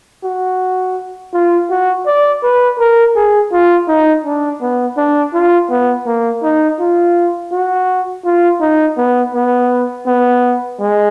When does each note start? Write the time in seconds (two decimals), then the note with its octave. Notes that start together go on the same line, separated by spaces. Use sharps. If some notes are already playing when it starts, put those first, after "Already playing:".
0.24 F#4
1.33 F4
1.70 F#4
2.06 D5
2.43 B4
2.79 A#4
3.15 G#4
3.52 F4
3.88 D#4
4.24 D4
4.61 B3
4.97 D4
5.34 F4
5.70 B3
6.06 A#3
6.43 D#4
6.80 F4
7.52 F#4
8.25 F4
8.61 D#4
8.97 B3
9.34 B3
10.06 B3
10.79 G#3